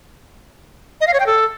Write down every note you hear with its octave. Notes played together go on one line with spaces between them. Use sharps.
D#5
F5
C#5
G5
A4